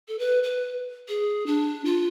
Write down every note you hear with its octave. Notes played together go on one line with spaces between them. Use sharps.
A4
B4
B4
G#4
D4
F4